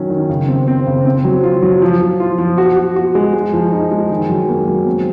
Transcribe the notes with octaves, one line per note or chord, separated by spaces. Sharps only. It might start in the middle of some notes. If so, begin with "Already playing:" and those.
Already playing: D#3 F#3 C#4
D#3
C#3
C4
C4
C#3
C4
F#3
F4
F#3
F3
F3
F4
F3
F#4
F#4
F#4
G#3
G#3
F3
D#4
G#3
D#3
F#3
A#3
F#3
C4